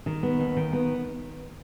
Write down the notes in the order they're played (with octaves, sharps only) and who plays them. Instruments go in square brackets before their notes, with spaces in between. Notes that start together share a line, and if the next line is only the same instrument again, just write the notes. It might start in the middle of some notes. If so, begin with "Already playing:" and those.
[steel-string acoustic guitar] D#3
B3
D#2
D#3
B3